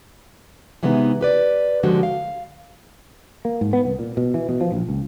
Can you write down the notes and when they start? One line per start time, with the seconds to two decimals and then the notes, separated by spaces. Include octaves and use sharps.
0.83 C3 E3 G3 G#3 B3 D#4
1.21 G4 B4 D5
1.83 D3 F3 G#3 F#4 G4
2.03 F5
3.45 A#3
3.61 G#2
3.73 B3
3.85 C2
3.99 A#2
4.17 B2
4.34 E3
4.49 B2
4.61 F3
4.72 A#1
4.89 C#2